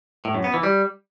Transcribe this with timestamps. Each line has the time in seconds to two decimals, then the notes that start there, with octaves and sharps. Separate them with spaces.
0.25 A2
0.35 F#2
0.44 B3
0.54 E3
0.63 G3